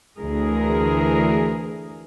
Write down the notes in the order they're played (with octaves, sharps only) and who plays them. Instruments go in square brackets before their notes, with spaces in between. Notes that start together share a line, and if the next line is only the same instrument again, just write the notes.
[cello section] D2 E3 G#4 A#4